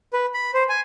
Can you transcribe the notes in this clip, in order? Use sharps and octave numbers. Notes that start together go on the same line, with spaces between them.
B4
B5
C5
G#5